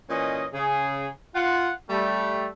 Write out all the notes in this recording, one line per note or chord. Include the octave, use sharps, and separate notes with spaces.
A#2 E3 C#4 D#5
C#3 G#4
F4 F#5
G3 A3